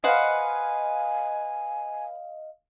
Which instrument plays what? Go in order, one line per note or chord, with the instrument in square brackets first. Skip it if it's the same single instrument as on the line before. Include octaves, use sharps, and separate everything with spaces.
[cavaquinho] B4 C5 F#5 [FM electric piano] D#5 F5 [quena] G#5